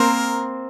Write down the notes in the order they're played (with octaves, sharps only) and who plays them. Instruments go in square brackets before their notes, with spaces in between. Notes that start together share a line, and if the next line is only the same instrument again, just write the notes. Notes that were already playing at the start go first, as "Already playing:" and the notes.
Already playing: [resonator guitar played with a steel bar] A#3 C4 [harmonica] A#4